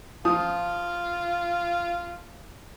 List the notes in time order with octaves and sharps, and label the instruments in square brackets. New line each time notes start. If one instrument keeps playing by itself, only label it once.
[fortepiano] F3 D#6 [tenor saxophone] F4